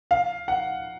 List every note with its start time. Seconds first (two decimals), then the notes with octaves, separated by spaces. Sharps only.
0.11 F5
0.48 F#5